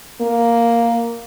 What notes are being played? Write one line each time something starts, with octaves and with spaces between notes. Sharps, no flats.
A#3